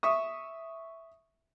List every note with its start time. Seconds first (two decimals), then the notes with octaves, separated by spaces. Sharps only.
0.03 E5 C#6 D#6